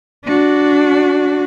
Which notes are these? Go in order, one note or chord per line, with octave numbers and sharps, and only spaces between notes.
D4 F#4